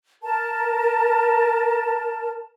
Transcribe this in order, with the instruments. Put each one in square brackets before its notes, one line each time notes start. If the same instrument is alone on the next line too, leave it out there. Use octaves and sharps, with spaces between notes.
[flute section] A#4 A5